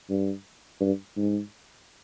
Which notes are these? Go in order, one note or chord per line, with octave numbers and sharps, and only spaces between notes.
G2
G2
G#2